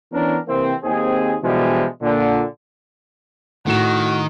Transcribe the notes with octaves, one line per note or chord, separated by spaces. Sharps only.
E3 B3 C#4 D4 A#4
C3 E3 A#3 C4
D#2 C4 G#4
B2 D3 E3 F3 G3 G#3
A#2 D3
A2 D#3 F#4 E7